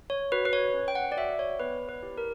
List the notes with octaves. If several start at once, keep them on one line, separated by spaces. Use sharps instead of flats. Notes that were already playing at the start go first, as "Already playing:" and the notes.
C#5
F#4 B4
B4
C#5
C#4
G5
F#5
D5
F#4 E5
C#5
B3 B4
B4
E4 G4
A#4